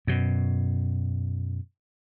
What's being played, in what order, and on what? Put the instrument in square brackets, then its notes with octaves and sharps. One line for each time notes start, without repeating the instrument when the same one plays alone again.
[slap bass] F#2 B2